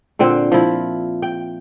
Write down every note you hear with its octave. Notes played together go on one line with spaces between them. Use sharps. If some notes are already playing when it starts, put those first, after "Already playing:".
A#2 D3 C4
F3 E4
G5